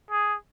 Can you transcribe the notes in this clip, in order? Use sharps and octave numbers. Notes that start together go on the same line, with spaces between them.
G#4